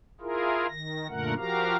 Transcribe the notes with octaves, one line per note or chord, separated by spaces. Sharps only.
E4 F4 G#4 A#4
D#3 A#6
F#2 A#2 D3 A3 A#4 F#5
F3 F#4 G4 A#4 F5 A#5